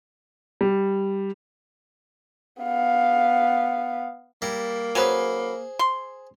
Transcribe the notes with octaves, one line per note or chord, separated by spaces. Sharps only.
G3
B3 F5
G3 A#3 E4 A#5
F#3 C#4 G#4 B4 C5 G#5
C6